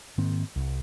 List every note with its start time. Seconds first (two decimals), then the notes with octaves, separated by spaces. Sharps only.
0.18 G#2 D#3 A#3 C4
0.56 C2